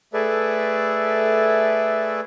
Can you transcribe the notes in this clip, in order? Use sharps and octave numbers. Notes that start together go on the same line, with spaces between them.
A3 G#4 A4 B4 D5 E5